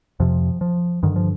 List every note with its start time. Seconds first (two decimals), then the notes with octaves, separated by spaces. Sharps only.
0.20 F2 C3 F3
0.61 F3
1.03 G2 D3 D#3
1.16 F3